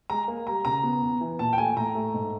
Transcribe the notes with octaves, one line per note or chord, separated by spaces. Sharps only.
G#3 A#5
A#3
G3 A#5
C#3 A#5
B3
E2
E3
A#2 A5
G5
A3 G#5
A2 A#5
A3
G#2